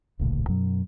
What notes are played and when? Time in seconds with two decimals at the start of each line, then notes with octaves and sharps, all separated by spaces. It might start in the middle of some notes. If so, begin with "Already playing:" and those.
0.19 D1 A#1 A2 C#3
0.48 F#2 B2 F#3